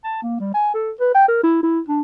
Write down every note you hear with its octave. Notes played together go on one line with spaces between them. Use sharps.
A5
A#3
G3
G#5
A4
B4
G5
A#4
E4
E4
D4